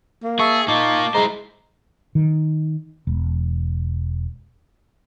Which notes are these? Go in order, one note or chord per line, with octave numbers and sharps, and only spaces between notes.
A#3
G#4 E5 A5 C#6
A#3 D#4 F4 A5 D6
G#3 E4 C5 A#5
D#3
E1